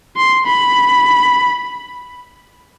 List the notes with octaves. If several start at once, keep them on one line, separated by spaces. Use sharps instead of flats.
C6
B5